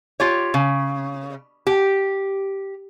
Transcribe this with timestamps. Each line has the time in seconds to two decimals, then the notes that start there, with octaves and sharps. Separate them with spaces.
0.20 F4 G4 C#5
0.54 C#3
1.67 G4